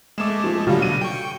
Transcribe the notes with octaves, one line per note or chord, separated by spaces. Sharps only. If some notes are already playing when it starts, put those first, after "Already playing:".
G#3 A3 D6 E7
F3
B2 D3 F#3 G3 F4 F#4
D#7
G5 C#6